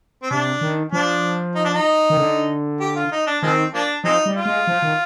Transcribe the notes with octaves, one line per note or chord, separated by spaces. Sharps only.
C4
C3 D4
D#3
F3 D4
D#4
D4
D#4
D#3
D3
G4
F4
D#4
D4
D#3 F3 G#3 C4
F3 A#3 D4
F3 G#3 C4 D#4
G3
F4
G#3
F3
D#3